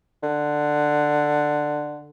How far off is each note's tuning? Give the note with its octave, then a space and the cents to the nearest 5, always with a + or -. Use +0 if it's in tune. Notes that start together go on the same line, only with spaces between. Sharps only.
D3 +10